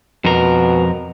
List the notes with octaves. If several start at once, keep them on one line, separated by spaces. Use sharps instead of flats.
F2 B2 A#4